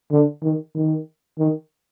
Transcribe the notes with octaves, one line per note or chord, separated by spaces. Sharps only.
D3
D#3
D#3
D#3